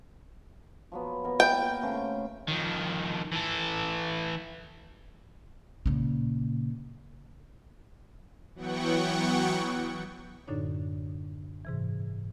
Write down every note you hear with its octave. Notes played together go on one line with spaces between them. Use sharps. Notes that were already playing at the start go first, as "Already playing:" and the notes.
F3 F#3 B3
A#3 B3 A#4
G5
C#3 A3 C4
F2 D#3
E3 A4
A#2 C#3
E3 F#3 B3 F#5 G5 C#6
F#2 A2 D3 D4 D#4 C#5
G#2 C3 E3